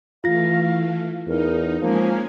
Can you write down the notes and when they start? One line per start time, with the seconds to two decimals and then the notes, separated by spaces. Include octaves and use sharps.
0.24 E3 A3 F4 F5 A#6
1.28 E2 D#4 A#4
1.81 F3 G#3 A#3 C#4 G#5